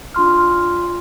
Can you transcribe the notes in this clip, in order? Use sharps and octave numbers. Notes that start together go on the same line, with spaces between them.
D4 F4 C6 F6